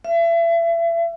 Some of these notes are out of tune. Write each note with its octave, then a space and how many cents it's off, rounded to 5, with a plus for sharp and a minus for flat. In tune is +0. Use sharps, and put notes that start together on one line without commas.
E5 +35